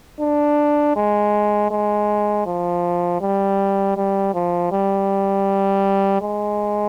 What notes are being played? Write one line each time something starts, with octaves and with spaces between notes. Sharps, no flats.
D4
G#3
G#3
F3
G3
G3
F3
G3
G#3